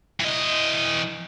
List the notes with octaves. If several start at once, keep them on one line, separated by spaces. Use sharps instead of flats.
E3 D#5